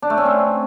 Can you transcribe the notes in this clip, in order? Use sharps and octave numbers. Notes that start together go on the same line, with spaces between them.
D4
A3
C#4
C4